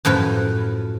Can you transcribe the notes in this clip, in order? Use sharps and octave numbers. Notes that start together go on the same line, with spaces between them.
F#2 A2 F3 B4